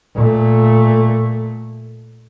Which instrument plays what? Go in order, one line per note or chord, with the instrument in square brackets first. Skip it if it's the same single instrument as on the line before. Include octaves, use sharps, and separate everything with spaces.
[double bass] A#2 A3